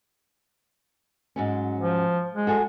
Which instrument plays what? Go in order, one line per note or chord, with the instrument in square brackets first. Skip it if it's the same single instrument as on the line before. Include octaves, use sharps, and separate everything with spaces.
[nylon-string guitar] G#2 F#3 C#4
[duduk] F3
G#3
[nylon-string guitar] F#4 A4 G#5